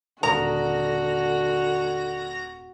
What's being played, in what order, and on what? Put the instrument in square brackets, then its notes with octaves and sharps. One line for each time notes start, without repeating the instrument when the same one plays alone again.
[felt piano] D#1 A#4 D#6 [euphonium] D3 [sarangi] F#4 [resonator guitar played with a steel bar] A#5